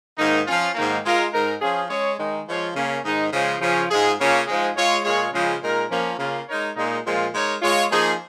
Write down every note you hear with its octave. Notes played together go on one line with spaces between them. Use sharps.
G#2 D#3 A#3 D#4
F3 C#4 F4
G#2 D#3 A#3
G#3 F4 A#4
G#2 G#3 D#4 A#4
F3 C#4 F4 G#4
G#3 C#4 G#4 C#5
D#3 G#3 D#4
F3 G#3 F4 C#5
C#3 A#3 C#4
G#2 D#3 G#3 D#4
C#3 F3 G#3
C#3 F3 C#4
G#2 G#3 F4 G#4
C#3 A#3 C#4 F4 C#5
G#2 F3 G#3
G#3 F4 C#5
A#2 G#3 F4 G#4 C#5
C#3 F3 G#3
A#2 G#3 D#4 A#4
F3 A#3 C#4
C#3 A#3 F4
G#3 D#4 A#4 C#5
A#2 G#3 D#4
A#2 F3 G#3 F4
G#3 D#4 A#4 C#5
G#3 F4 C#5
F3 A#3 D#4 G#4